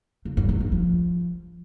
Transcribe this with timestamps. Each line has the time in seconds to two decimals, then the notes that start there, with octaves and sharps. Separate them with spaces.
0.25 C#3
0.37 G2
0.49 D#3
0.60 G2
0.72 F3